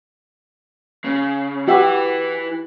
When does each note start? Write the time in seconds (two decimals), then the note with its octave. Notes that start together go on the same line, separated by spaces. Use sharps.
1.05 C#3
1.68 E3 E4 F#4 G4 E5